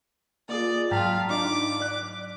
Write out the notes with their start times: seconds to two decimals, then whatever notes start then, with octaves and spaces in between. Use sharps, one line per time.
0.49 A#3 F4 G#4 D5 D#5 D#6
0.91 G#2 F#3 F4 F5 G5 A5 A#5 B6
1.30 D4 D#4 D6
1.80 D5 F#6